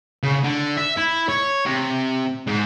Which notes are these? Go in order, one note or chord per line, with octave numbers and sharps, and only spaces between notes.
C#3
D3
E5
E4
C#5
C3
G#2